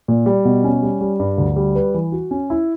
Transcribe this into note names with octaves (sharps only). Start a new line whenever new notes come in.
A#2
G3
B2
C#4
G3
G3
G2
D2
G3
B4
E3
F#4
C#4
E4